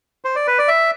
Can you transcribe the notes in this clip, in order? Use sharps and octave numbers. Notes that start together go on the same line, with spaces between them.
C5
D5
B4
D5
E5